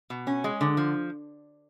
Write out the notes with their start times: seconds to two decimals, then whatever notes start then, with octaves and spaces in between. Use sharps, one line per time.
0.10 B2
0.27 C#4
0.44 G#3
0.61 D3
0.77 F3